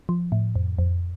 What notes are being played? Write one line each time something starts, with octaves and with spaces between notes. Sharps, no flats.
F3
A2
F2
F2